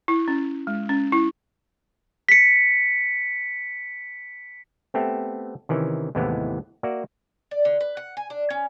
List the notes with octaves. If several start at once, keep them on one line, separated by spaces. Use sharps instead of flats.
E4
C#4
G#3
C#4
E4
B6 C#7
A3 B3 C4 G4 A4 E5
C3 D#3 E3 C#4
D#2 A2 C3 E3 G#3 B3
A#3 F#4 D5 E5
D5
D3
B4
F#5
G#5
D4
C#4